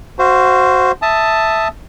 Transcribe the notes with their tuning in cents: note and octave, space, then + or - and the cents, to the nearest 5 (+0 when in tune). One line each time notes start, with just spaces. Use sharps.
F#4 +0 C5 +0 F5 -35
E5 +0 A5 +5 D#6 +0